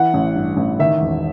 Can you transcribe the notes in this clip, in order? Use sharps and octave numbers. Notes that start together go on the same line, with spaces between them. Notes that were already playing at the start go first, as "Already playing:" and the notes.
Already playing: E3 F#5
A1
G2
A1
D#3 E5
E1